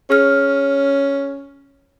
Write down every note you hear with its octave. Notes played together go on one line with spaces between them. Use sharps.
C#4 G#4 F6